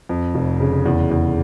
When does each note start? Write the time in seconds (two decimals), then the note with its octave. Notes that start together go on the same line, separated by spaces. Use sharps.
0.09 F2
0.35 F1
0.60 C#3
0.85 E2
1.11 E2